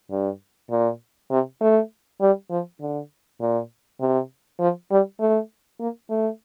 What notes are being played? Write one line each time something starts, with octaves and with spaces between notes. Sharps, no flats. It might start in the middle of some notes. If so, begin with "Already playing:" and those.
G2
A#2
C3
A3
G3
F3
D3
A#2
C3
F3
G3
A3
A#3
A3